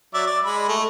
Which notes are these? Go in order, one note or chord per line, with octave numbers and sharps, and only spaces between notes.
F#3 D5 E5
D5
G#3 B5
A3